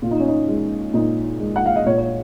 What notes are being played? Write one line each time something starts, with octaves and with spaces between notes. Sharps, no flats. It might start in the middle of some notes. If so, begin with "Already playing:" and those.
A#2 F4
D#4
C#4
D#4
G#3
A#2 D#4
G#3
F#5
F5
D#5
A#2 C#5
C#5